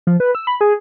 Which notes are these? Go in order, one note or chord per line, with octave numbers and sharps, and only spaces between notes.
F3
B4
E6
B5
G#4